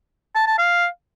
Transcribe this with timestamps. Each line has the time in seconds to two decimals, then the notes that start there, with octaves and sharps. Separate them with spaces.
0.35 A5
0.47 A5
0.58 F5